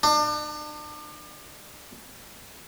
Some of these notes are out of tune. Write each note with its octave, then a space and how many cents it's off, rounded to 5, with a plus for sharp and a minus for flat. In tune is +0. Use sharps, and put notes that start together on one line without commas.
D4 +35